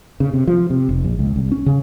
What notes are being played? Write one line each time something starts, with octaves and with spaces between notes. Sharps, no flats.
C#3
C3
F3
C3
F1
A#1
C#2
C2
C#4
C#3